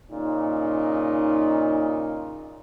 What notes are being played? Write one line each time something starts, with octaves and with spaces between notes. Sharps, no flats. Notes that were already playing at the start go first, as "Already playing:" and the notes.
A#2 C#3 D#4